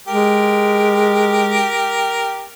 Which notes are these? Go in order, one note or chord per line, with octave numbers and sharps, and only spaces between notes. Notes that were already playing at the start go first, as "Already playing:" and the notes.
G#3 G4 A#4